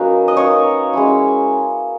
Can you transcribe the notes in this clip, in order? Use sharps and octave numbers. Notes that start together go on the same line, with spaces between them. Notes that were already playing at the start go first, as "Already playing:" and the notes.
Already playing: F#3 A#3 C#4 D#4 B4
D#5
A#3 D#4 C#5
G#3 C#4 E4